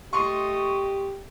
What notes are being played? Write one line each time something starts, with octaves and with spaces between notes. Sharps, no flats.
A3 G4 D#5 C6 C#6